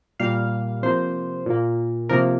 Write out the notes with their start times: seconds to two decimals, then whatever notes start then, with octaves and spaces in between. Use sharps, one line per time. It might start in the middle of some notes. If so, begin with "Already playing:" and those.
0.20 A#2 G3 A#3 F5
0.83 C3 F3 A#3 C5
1.46 A#2 A#3
2.09 C3 F3 A#3 A#4